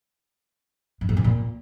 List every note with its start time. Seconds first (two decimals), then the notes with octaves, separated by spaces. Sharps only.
1.01 G2
1.09 G#2
1.17 C3
1.24 A#2